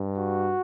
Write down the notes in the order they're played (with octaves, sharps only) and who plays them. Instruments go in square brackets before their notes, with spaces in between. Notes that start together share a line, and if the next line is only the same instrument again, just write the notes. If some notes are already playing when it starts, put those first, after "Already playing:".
Already playing: [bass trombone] G2
[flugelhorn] F#4